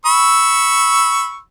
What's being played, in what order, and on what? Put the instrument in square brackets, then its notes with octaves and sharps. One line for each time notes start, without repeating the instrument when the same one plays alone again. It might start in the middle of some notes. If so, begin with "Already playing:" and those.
[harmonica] B5 C#6 E6